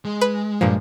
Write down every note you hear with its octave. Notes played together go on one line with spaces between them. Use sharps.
G#3
B4
G2 A#2 F3